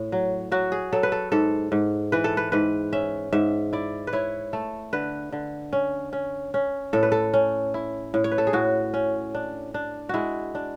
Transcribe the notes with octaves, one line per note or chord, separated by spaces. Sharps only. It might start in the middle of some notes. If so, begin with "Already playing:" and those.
Already playing: A2
F#3
F#3 F#4
G#4
F#3 A4
B4
A4
G#2 A4
G#2
E3 B4
A4
B4
G#2 B4
C#4 E5
G#2 E5
E4 D5
B4
E4 C#5
A3 A4
D3 B4
D3
C#4
C#4
C#4
A2 A4
B4
A4
C#4
E4
A2
C#5
B4
A4
G#4
A2 F#4
C#4
D4
D4
G#3 E4 F#4
D4